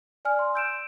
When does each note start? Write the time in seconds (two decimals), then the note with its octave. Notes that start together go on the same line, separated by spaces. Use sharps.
0.25 D5 G#5 F6
0.39 C6
0.54 E6 G6 D7 E7